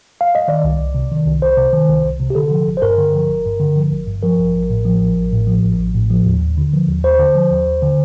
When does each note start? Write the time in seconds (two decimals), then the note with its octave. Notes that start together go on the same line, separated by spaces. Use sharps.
0.21 F5
0.35 D#5
0.48 D#3 D5
0.64 C2
0.80 C2
0.95 C3
1.11 D#3
1.26 C2
1.42 C2 C5
1.57 C3
1.73 D#3
1.89 C2
2.04 C2
2.20 C3
2.30 G4
2.35 D3 A4
2.51 F3
2.67 G1
2.77 C5
2.82 G2 A#4
2.98 D3
3.14 F3
3.29 G1
3.45 G2
3.60 D3
3.77 F3
3.91 G1
4.07 G2
4.22 F3 A#4
4.39 A1
4.55 A1
4.70 A2
4.85 F3
5.01 A1
5.16 A1
5.33 A2
5.47 F3
5.64 A1
5.79 A1
5.94 A2
6.10 F3
6.26 D#2
6.42 D#2
6.58 D3
6.73 F3
6.88 D#2
7.03 D#2 C5
7.19 D3
7.35 F3
7.50 D#2
7.67 D#2
7.82 D3